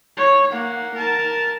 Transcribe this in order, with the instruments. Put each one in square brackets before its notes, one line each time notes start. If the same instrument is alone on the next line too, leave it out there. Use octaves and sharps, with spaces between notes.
[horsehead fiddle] C#5
A#3 F#5
A#4 A5